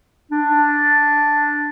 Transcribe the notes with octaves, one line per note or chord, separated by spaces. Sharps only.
D4